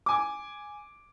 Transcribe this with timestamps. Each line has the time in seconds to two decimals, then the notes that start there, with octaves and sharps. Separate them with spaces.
0.06 G#5 D6